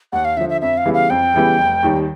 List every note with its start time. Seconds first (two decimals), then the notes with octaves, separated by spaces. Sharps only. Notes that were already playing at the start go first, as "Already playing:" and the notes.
0.13 D#2 F#5
0.25 F5
0.37 D3 E5
0.40 F3
0.49 E5
0.61 F2 E5
0.78 F5
0.85 C#3 E3 G3 B3
0.94 F5
1.10 F2 G5
1.34 C#3 E3 G3 B3
1.58 F1
1.83 D#2 D#3 G3